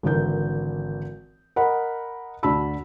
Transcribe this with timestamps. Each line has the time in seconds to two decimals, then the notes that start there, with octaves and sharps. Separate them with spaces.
0.03 G#1 D3 E3 A#4 G6
1.56 A#4 D#5 F#5 B5
2.43 D2 D4 F#4 A5 B5 E6